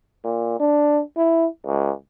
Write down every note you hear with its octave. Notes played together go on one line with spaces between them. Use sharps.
A#2
D4
E4
C#2